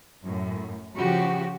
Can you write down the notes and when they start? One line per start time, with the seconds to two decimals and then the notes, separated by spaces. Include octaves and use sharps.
0.24 F#2 A2
0.96 C#3 F3 F#4 G4